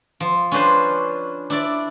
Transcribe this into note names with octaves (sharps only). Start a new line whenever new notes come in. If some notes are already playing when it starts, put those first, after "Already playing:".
F3
C#4 D4 B4 C5
D4 E4 D5